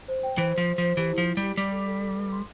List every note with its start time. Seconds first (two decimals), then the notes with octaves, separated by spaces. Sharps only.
0.08 C5
0.23 G5
0.38 E3 C5
0.53 F3 C5
0.67 C5
0.78 F3 C5
0.97 E3 G4
1.13 E4
1.18 F3
1.28 E4
1.37 G3
1.42 G4
1.57 G3 D6
1.72 A4
1.87 A4
2.01 A4
2.16 B4
2.32 C6